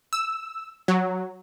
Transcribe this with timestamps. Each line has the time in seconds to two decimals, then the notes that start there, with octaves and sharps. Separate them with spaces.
0.13 E6
0.88 F#3